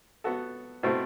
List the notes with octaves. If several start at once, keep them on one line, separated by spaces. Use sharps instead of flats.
B3 F#4 A4
B2 A3 C4 E4